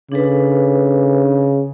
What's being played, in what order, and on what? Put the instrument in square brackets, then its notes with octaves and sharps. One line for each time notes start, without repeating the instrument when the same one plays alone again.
[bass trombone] C#3 [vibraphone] D4 A4 B4